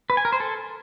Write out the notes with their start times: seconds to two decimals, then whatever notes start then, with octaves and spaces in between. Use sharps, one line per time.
0.10 B4
0.17 G#5
0.25 A#4
0.32 C5
0.40 A4